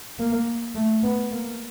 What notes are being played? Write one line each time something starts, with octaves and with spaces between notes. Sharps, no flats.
A#3
A3
B3
A#3